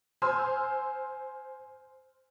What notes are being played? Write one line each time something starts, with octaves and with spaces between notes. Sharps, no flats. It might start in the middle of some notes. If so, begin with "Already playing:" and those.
C5 G#5 C6 E6 F6